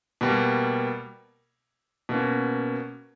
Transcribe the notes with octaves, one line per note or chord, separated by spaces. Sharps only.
B2 G3 A#3
B2 A#3 C#4